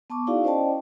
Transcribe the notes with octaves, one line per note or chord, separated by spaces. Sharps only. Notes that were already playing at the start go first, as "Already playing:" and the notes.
B3 A5 C#6 D6
D#4 E4 F#4 G#4 D5 F5
C#4 C5 D5 D#5 G5 A5